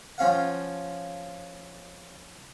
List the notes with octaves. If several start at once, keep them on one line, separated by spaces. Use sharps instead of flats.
F3 C#4 F5 F#5